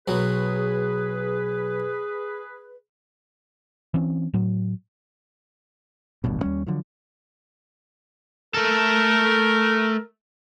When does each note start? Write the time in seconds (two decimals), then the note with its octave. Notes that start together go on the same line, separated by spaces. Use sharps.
0.08 B1 F#3 G#4 B4
3.94 E3 C4 C#4
4.34 A2 F#3
6.24 D#1 A1 G2 B2
6.42 D#2 G3 C#4
6.67 D3 F3 F#3
8.54 A3 A4 A#4